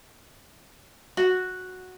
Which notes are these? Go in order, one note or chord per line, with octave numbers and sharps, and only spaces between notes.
F#4